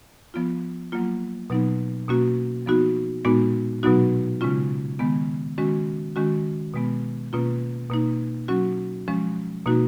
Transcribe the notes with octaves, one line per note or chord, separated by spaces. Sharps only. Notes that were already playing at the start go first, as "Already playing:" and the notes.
F3 B3 F4
F#3 A#3 F4
B2 F#3 B3 D#4
B2 A#3 C#4 F#4
F3 B3 D#4 F#4
A#2 G#3 B3 D#4 F#4
B2 F#3 B3 D#4 F#4
C#3 G#3 C#4 F4
D#3 G#3 B3
D#3 G#3 C#4 F#4
D#3 G#3 C#4 F#4
B2 G#3 B3
B2 A#3 C#4 F4
B2 A#3 D#4
F#3 C#4 F#4
F3 G#3 C#4
B2 A#3 D#4 F#4